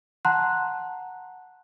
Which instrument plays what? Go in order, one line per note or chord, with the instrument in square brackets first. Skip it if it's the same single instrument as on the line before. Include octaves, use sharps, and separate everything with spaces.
[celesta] F#5 A5 A#5 C6 F#6